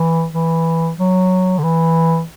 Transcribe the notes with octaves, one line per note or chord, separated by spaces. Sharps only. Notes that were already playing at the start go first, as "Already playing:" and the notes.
Already playing: E3
E3
F#3
D3
E3